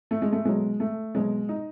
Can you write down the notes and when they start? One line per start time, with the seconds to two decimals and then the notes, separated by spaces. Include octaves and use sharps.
0.11 A3
0.22 G#3
0.32 A3
0.45 B2 F#3 G#3
0.80 A3
1.15 B2 F#3 G#3
1.49 D#4